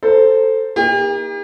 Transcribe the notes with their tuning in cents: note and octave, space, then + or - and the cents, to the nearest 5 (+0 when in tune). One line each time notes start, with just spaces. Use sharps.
A4 +10 C5 +0 A#5 +0
A#3 +30 D#4 +30 G4 +45